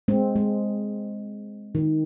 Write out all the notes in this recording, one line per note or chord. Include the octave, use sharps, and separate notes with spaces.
G#3 C4
G#3
D#3